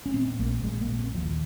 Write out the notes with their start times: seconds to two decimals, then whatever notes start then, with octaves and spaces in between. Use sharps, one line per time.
0.06 C#4
0.14 A#2 C4
0.39 A#1 A#3
0.64 A#1 G#3
0.81 A#3
0.89 A#2
0.98 C4
1.14 D#2 F3